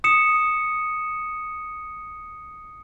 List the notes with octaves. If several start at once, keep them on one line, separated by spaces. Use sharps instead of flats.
D#6 C#7 E7